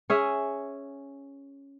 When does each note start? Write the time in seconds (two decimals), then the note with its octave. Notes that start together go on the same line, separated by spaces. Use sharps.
0.10 C#4 G#4 E5